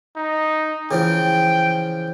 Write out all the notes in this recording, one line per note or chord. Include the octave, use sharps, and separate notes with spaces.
D#4
C#3 E3 F3 G5